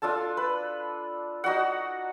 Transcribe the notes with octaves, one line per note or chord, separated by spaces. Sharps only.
D4 F4 A4 A5
B4
D#4 F#4 D5 F#5